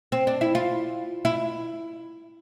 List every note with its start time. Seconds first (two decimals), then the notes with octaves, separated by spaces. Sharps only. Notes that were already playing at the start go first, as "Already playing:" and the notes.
0.12 C4
0.27 D4
0.41 E4
0.55 F4
1.25 E4